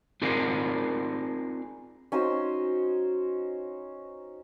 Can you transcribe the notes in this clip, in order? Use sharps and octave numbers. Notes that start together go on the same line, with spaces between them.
C4 D#4 F4 G#4 A#4 D5
C#4 D#4 F#4 C5